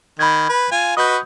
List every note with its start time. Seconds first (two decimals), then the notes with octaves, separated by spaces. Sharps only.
0.19 D#3 B5 G6 G#6
0.49 B4
0.71 F4 G#5
0.97 F#4 B4 D#5 D#6 G6